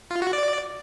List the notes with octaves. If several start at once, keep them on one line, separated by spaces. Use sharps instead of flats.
F4
F#4
D5